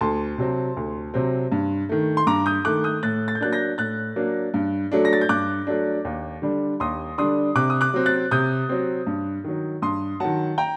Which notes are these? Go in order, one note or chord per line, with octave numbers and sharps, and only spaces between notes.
D2 A5 C6
C3 F#3 C4
D2
C3 F#3 C4
G2
D#3 A3
C6
G2 A#5 D6
D#6 G6
D#3 A3 D6 F#6
D#6 G6
A2 F#6 A6
A6
G6
F#3 A#3 D4 F#6 A6
G6 A#6
A2 F#6 A6
F#3 A#3 D4
G2
F#3 A3 D4
A#6
A6
G6
G2 D6 F#6
F#3 A3 D4
D#2
D3 G3 D4
D#2 C6 D#6
D3 G3 D4 C6 D#6
C3 D6 F#6
D#6
D6 F#6
F#3 C4
F#6 A6
C3 D#6 G6
F#3 C4
G2
D#3 F#3
G2 C6 D#6
D#3 F#3 F#5 A5
G5 A#5